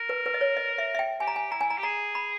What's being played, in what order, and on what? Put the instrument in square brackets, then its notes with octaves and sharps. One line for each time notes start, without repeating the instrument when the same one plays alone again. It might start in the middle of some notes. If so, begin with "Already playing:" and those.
Already playing: [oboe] A#4
[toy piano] B4
B4
D#5
C#5
D#5
E5
E5
G5
[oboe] G4 [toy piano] G#5
[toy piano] A#5
G#5
[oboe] E4 [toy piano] A#5
[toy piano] G#5
A#5
[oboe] G4
[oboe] G#4 [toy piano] A#5
[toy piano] B5